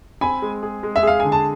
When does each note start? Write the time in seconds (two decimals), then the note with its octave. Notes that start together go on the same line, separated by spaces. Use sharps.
0.21 C4 G#5 B5
0.42 G#3
0.63 G#4
0.83 G#3
0.96 E5
1.03 G#4 F5
1.20 D3 G#5
1.32 A5